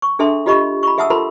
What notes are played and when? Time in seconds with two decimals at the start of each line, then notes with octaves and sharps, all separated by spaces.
0.02 C#6
0.19 D4 G#4 A4 E5 A5 C6
0.46 F4 G4 D#5 B5 C#6
0.83 B5 C#6
0.98 G#4 E5 F#5 A5 D#6 E6
1.10 F4 A4 A#4 A5 B5 C6